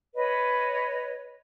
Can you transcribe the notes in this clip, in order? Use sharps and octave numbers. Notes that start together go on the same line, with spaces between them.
B4 C#5 D#5